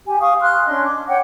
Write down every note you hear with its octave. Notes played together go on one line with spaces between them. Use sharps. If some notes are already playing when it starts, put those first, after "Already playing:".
G4 G#5
F5 C#6 D#6
C6 F6 F#6
C#4 D4 D#5 C6
D6
C#5 F#5 G5